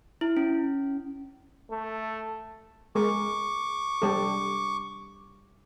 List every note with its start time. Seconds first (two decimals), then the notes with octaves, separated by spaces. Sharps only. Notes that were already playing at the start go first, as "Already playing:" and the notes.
0.21 E4
0.37 C#4
1.71 A3
2.95 G#3 A#4 C#6 D6
4.02 G3 A4